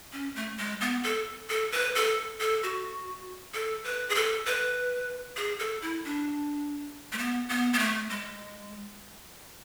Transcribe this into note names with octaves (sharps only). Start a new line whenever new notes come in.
C#4
A3
G#3
B3
A4
A4
B4
A4
A4
F#4
A4
B4
G#4
A4
B4
G#4
A4
E4
D4
A3
B3
B3
B3
A3
G#3